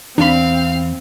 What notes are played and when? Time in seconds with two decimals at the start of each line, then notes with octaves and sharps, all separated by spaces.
0.18 E2 C4 D4 F5 B5